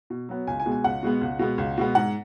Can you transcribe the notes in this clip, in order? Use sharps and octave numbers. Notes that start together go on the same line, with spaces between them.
B2
F#3 B3
C#2 G#5
G#5
B2 G#3 B3
G#5
C#2 F#5
B2 G#3 B3
C#2
B2 G#3 B3
C#2
B2 G#3 B3
G#2 F#5